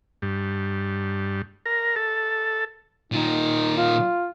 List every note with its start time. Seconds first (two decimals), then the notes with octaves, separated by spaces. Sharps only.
0.22 G2
1.66 A#4
1.96 A4
3.12 A#2 D#3 D#4
3.77 F4